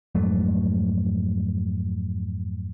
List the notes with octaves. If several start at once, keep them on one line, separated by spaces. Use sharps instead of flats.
F2 G#2 F#3 A3